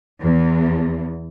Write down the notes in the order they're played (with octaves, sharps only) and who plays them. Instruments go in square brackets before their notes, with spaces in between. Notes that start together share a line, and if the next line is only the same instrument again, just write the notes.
[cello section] E2